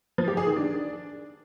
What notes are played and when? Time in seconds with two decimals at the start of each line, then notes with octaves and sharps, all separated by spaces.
0.18 F3
0.28 G4
0.37 G#4
0.47 D#3
0.56 D4